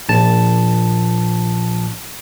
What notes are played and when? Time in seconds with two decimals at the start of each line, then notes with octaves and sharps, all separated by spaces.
0.09 A#1 A5